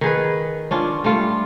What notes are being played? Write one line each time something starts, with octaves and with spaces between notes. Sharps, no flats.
D#3 G#4 B4
C#4 D4 F4
G3 A3 F4